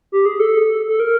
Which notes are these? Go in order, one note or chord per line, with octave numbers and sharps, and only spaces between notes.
G4
G#4
A4
A4
A#4